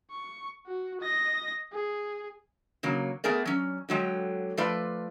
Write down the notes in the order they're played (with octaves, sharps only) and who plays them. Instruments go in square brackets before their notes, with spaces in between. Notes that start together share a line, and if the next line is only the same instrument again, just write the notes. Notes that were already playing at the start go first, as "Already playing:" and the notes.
[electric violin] C#6
F#4
D#5 A#6
G#4
[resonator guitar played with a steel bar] C#3 F#3 A#3
A3 B3 G#4 A#4 D5
F#3 C#4
D3 F#3 G#3 G5
F3 A3 F4 B4 D5